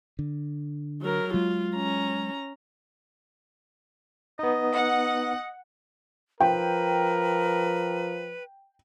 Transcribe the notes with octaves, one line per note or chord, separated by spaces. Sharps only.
D3
F#3 A#4
F#3 G#3 F4
C#4 A#5
B3 D#4 D#5
F#5
F3 A#4 B4 G5